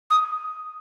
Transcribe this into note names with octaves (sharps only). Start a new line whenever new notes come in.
D#6